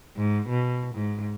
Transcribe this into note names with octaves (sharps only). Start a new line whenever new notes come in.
G#2
B2
G#2